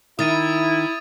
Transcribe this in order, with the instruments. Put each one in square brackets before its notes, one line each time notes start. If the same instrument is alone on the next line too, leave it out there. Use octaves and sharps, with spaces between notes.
[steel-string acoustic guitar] D#3 [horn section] E4 [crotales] D#6 A6 D#7